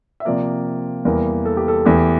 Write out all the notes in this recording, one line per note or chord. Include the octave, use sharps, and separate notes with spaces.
E5
C3 F3 A#3 D5
E2 E3 G3 A#3 A#4
A4
G4
A4
E2 E3 A3 G4